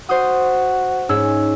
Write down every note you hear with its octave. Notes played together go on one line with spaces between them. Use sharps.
F#4 C5 D#6
G#2 C#4 E6